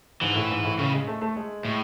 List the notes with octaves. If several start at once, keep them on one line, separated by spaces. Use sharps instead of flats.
G#2 E3
A2
G#2
A2
A2 C#3
G#3
A3
A3
G#3
A2